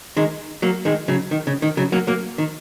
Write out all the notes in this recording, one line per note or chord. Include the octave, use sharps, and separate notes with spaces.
D#3 G#3
F#3 A#3
D#3 G#3
C#3 F#3
D#3
C#3
D#3
C#3 F#3
F#3 A#3
F#3 A#3
D#3